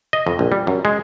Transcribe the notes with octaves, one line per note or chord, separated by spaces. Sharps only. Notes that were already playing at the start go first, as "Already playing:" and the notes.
D#5
F2
A#1
G3
F#2
G#3